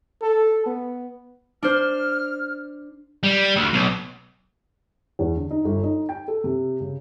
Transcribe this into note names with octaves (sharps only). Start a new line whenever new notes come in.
A4
B3
D4 C5 F6
G3
D2
B1
E2
D3
D#4
G1
D#4
G5
A4
C3
C#3